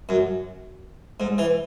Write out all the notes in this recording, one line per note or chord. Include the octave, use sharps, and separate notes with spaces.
F#2
G#2
E3